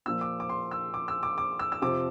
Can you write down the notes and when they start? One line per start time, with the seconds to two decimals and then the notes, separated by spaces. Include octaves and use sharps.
0.06 A#2 F3 A#3 E6
0.21 D6
0.40 D6
0.49 C6
0.71 E6
0.94 D6
1.08 E6
1.23 D6
1.38 D6
1.59 E6
1.72 E6
1.82 F2 C3 F3 D6